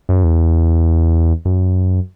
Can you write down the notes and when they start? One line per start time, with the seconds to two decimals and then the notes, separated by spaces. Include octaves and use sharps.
0.09 F#2
0.24 E2
1.45 F#2